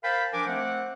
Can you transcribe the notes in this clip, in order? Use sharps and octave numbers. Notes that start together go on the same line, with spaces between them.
A#4 C5 F5 G5 A5 B5
F3 D4 A#4 G#5 D6
A3 C4 C5 F#5